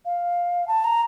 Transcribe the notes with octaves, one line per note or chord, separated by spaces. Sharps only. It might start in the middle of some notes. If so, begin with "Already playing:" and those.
F5
A5
A#5